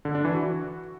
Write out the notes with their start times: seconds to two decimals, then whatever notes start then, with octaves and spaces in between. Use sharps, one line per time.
0.05 D3
0.15 D4
0.25 E3
0.34 F#4